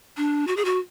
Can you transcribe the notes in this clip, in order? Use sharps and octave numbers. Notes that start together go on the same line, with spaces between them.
D4
F#4
G#4
F#4